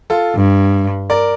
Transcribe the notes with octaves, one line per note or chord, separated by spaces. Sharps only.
F4 A4
G2
A#4 D5